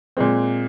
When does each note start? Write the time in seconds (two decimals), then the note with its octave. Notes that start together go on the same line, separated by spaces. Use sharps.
0.17 A#2 G#3 C4